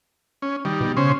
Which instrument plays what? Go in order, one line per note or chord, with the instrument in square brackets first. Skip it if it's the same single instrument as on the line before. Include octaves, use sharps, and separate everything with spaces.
[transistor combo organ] C#4
D#3 G3
[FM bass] B2
[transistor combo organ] C#3 C#4 C5